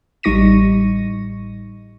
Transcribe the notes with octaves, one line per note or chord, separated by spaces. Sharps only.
A1 G3 D#4 C#6 A#6 D#7